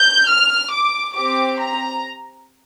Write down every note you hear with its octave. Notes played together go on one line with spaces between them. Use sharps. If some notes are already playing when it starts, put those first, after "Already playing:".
Already playing: G6
F6
D6
C4 G4 D6
A#5